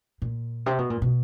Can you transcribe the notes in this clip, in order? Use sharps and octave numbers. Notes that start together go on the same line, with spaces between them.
A#2
C3
B2
A#2
B2